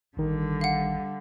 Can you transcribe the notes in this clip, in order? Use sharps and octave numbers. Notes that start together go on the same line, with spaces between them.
A1 D3 D#3 G3
F5 F#5